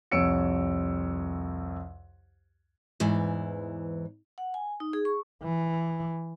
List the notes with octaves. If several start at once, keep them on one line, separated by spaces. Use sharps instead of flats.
C2 F2 C#5 E6 C#7 D7
E2 G#2 E3
F#5
G#5
D#4
G#4
C#6
E3